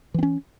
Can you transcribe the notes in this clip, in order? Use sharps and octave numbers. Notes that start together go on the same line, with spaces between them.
E3 C4 C#4